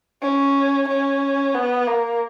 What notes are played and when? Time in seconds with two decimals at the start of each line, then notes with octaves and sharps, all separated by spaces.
0.22 C#4
0.89 C#4
1.54 B3
1.87 A#3